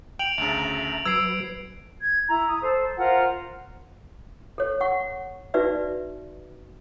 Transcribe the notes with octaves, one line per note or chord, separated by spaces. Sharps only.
G5 D7 F7 F#7
D2 C#3 E5 A5 A#5
F#3 B4 E6 G#6 C7 D7
G#6
E4 A#5
D#6
A4 C5
F4 A#4 C5 F#5
A4 C#5
F#5 C#6
D#4 F#4 B4 D5 E5